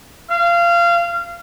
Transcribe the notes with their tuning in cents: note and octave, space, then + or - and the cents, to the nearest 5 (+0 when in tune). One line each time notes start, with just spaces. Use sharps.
F5 -25